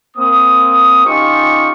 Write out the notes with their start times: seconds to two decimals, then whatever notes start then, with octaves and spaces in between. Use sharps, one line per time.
0.16 A#3 C4 D#6
1.05 C#4 D#4 F4 G4 C#6